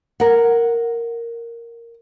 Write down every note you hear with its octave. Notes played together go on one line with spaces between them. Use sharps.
A#4 F#5